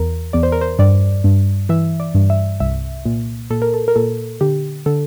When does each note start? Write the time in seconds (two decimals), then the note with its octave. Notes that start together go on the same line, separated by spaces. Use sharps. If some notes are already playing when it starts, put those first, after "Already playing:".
Already playing: E2 A#4
0.33 E2 D5
0.43 C5
0.52 A#4
0.61 C5
0.79 G2 D5
1.24 G2
1.69 E3 E5
2.00 D5
2.15 G2
2.30 E5
2.60 C2 E5
3.05 A#2
3.50 A#2 A4
3.62 A#4
3.74 A4
3.88 A#4
3.96 A#2 A4
4.41 D3 G4
4.86 D3 A4